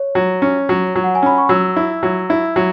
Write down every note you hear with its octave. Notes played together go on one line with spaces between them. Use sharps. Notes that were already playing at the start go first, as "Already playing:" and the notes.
Already playing: C#5
F#3
C#4
F#3
F#3
F#5
G#5
C#4 B5
C#6
F#3 E6
E4
F#3
E4
F#3